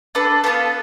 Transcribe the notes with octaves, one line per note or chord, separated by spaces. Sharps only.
D4 A4 B4
B3 D4 F4 A4 B4